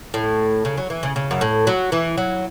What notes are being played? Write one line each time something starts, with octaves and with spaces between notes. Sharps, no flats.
A2
C#3
F#3
E3
C#3
C#3
F#2
A2
F#3
E3
F#3